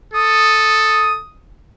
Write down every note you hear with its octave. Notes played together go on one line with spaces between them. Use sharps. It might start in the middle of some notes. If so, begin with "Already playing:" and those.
A4 D#6